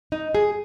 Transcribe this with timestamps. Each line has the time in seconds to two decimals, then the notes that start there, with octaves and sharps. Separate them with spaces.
0.12 D#4
0.35 G#4